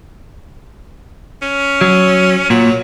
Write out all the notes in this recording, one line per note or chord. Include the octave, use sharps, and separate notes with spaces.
C#4
F#3
A#2 F#3